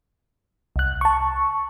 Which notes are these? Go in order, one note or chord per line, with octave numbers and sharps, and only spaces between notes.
C2 F#6
A5 C#6